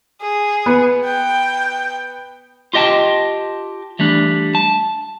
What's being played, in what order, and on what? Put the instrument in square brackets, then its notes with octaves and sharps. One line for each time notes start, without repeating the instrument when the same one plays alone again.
[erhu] G#4
[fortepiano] B3
[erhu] G5
[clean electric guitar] F4 G4 D#5 G5 A5
E3 G3 A3 D4
A5